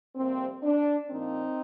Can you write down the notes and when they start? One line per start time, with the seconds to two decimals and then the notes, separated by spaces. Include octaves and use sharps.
0.15 F2 C3 G3 A#3 C4
0.63 D4
1.09 A#2 F3 A#3 C4 D#4